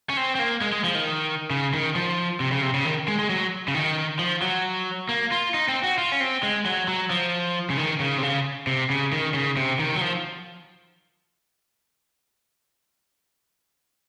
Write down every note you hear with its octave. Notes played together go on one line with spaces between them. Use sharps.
C#4
C4
C4
A#3
G#3
G#3
F3
D#3
C#3
D#3
F3
C3
C#3
C3
C#3
D#3
G#3
G#3
F#3
C#3
D#3
F3
F#3
A#3
F4
D#4
C4
F#4
F4
C#4
C4
G#3
F#3
F#3
F3
C#3
D#3
C#3
C3
C#3
C3
C#3
D#3
C#3
C3
D#3
F#3
F3